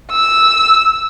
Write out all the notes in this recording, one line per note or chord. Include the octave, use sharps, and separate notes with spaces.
E6